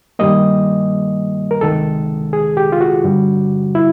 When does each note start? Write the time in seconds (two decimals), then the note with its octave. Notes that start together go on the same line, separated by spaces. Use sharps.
0.19 G2 D#3 G3 A#3 D#5
1.51 A#4
1.61 C#2 C3 D#3 G#3 A4
2.33 G#4
2.57 G4
2.72 F4
2.81 F#4
3.04 G2 D3 G3
3.75 E4